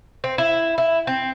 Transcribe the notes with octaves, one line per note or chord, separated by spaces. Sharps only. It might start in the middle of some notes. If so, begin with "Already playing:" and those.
C4
E4
E4
C4